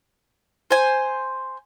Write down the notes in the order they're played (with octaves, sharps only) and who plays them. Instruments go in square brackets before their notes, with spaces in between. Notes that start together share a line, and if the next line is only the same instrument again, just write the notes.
[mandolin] C5 G#5